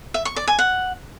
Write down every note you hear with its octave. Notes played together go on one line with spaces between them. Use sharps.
E5
C#6
D5
G#5
F#5